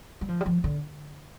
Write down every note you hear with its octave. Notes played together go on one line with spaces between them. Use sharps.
G3
F3
G3
F3
D3